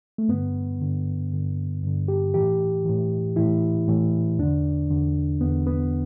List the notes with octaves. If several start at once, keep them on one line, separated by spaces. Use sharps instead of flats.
A3
G2 D3 B3
G2 D3
G2 D3
G2 D3
G4
A2 E3 G4
A2 E3
A2 E3 E4
A2 E3
E2 D3 D4
E2 D3
E2 D3 B3
B3